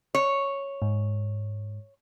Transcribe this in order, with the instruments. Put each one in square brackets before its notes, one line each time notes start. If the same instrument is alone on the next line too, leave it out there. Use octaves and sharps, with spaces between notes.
[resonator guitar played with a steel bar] C#5
[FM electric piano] G#2